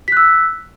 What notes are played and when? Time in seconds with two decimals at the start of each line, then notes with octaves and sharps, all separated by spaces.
0.08 B6
0.12 F#6
0.17 E6